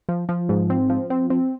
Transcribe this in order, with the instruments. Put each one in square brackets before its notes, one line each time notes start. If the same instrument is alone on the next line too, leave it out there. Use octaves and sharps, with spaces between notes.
[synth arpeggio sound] F3
F3
G#2
C4
F3
C4
C4